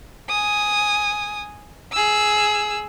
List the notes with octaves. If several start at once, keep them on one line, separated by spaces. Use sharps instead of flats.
G#5 D#6
G#4 E6